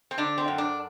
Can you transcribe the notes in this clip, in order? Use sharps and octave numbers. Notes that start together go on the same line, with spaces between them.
C4
D3 D4
C4
F#2
D4